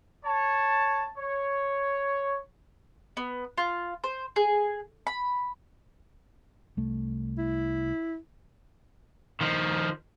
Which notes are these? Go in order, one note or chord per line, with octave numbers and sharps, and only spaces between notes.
C#5 A5
C#5
B3
F4
C5
G#4
B5
C2 A3
E4
D#3 F3